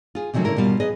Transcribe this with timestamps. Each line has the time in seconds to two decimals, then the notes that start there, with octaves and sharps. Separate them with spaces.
0.15 F4 G#4
0.33 C3 D#3 F3 F#3 A3 C#4
0.45 A#2 D3 C#4 E4 A#4
0.57 D#2 B2 G3 F4
0.80 G#4 B4 D#5